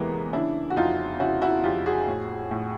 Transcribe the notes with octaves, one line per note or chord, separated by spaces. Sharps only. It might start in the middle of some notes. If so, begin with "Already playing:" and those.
Already playing: E2 C3 E3 G#3 A#3 B3
C#3 D4 E4
F#4
F2 D#4 F4
C#3 E4 F#4
E4 F#4
F2 F4 G4
F#4 G#4
A2
A2